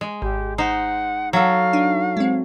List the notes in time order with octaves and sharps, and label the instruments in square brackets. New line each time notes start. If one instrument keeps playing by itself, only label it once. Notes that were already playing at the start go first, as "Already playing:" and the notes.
[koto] G#3
[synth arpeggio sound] G#1 [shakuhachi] G4
[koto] D#4 C5 [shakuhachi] F#5
[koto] F#3 A4 [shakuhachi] F5
[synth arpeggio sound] D4 D#4
G#3 C4